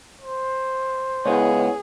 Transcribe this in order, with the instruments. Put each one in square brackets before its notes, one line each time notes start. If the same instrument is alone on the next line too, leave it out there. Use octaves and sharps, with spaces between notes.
[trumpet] C5
[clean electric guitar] C#2 B3 [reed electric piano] E4 C#5 [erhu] G#4